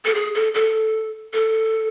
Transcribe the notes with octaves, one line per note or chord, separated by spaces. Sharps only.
A4
G#4
A4
A4
A4